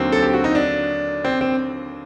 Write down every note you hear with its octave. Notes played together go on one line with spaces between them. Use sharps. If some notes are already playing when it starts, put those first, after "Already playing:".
Already playing: D#2 D3 F#3 C4
A4
G4
F#4
D#4
D4
C4
C4